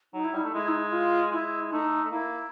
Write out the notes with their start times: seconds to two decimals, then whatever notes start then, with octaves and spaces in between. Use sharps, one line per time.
0.14 F#3 D#4
0.25 E4
0.33 G3 D#4
0.44 A3
0.53 G#3 E4
0.68 D#4
0.80 E4
0.92 F4
1.32 G#3 E4
1.72 A3 D#4
2.05 A3
2.11 A#3 E4